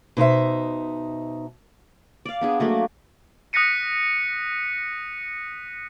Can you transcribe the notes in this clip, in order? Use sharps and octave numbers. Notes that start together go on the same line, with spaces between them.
B2 D#4 C5 E5
D5 F5
B3 D4 G#4
F#3 A3 A#3
D#6 F#6 A#6 B6 C#7 D#7